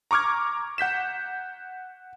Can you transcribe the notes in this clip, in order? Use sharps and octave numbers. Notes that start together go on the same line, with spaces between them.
A#5 C#6 D6 F6 G#6
F#5 G6 B6 E7